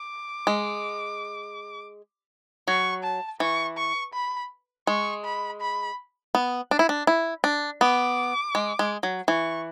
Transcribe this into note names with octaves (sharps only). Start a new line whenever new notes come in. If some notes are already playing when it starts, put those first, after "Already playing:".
Already playing: D6
G#3
F#3 C#6
A5
E3 C#6
C#6
B5
G#3 C#6
B5
B5
B3
D4
E4
D4
E4
D4
B3 D6
G#3
G#3
F#3
E3 C#6